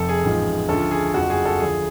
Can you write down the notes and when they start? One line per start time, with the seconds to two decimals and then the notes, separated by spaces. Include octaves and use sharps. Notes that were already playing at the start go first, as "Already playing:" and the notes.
Already playing: F1 F2 A4
0.09 G#4
0.24 A1 G#2 F3
0.69 D2 C#3 F3 A4
0.91 G#4
1.14 F#1 F2 F3 F#4
1.30 G#4
1.45 A4
1.60 D2 D3 F3 G#4